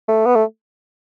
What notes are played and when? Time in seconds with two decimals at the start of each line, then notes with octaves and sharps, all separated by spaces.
0.08 A3
0.26 B3
0.36 A3